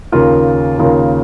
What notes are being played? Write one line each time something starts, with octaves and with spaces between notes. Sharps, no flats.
D#2 C#3 A#3 F4 A#4
D#2 C#3 A#3 F4 A#4